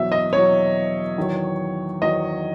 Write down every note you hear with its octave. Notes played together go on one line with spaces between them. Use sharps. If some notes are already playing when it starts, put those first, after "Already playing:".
Already playing: E2 B2 F#3 E5
D#5
E2 B2 F#3 C#5
E2 D#3 F#3
E2 D#3 F#3 D#5